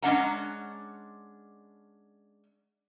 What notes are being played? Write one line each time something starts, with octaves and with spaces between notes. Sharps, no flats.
G#3 C#4 D4 F#5 A#5